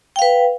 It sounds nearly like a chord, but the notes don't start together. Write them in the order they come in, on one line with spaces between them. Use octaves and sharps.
G5 F5 B4